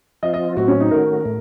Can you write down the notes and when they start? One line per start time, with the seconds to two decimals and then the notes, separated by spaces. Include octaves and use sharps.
0.23 F3 C4 F4 D#5
0.34 D#5
0.57 A2 F#3 C4 F#4
0.68 C#4
0.80 D#4
0.91 D#3 A3 C#4 F#4 A#4
1.25 A2 A3